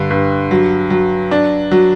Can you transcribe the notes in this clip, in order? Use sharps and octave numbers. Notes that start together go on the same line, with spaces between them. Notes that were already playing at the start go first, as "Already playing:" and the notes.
Already playing: G2 D3
G2
F#3
F#3
D4
F#3